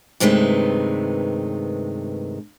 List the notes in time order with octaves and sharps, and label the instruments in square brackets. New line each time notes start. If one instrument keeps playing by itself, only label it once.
[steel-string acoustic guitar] G2 C3 D#3 G#3 A3 B4